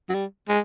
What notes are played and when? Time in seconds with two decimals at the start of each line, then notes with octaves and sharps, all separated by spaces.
0.09 F#3
0.14 G3
0.49 G#3